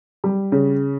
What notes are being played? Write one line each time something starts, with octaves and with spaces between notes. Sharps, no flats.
G3
C#3